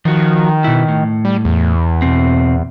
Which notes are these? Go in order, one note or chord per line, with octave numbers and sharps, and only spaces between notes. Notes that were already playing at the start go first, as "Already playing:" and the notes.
D#3 F3 F#4
B2 E4
A2
G3
E2
B2 C4